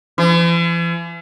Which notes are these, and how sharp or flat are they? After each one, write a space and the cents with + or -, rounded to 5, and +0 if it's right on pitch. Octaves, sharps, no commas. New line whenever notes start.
E3 +45